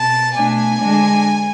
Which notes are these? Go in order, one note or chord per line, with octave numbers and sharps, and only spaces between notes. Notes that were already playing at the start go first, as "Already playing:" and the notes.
Already playing: B2 A5
B2 A3 D4 G#5
D3 G#3 D4